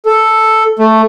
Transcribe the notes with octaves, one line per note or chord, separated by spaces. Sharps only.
A4
A3